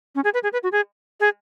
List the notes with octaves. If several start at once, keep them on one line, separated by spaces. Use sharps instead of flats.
C#4
G#4
B4
G#4
B4
F#4
G#4
G#4